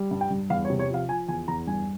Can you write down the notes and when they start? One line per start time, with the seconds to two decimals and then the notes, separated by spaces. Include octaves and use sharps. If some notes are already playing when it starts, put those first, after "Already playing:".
Already playing: G3
0.11 G2
0.21 G5
0.31 G2
0.50 E2 F5
0.65 C#5
0.70 C3
0.79 C#5
0.90 F3 F5
1.09 F3 G#5
1.28 E2 G#5
1.48 E2 A#5
1.67 G2 G#5